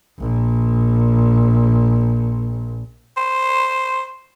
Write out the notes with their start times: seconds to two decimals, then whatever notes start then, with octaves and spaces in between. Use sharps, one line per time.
0.18 A#1 A#2
3.17 C5